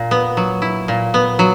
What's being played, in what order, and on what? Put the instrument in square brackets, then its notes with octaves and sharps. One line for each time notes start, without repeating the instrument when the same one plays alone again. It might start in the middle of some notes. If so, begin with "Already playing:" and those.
Already playing: [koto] A#2
B3
F#3
E4
A#2
B3
F#3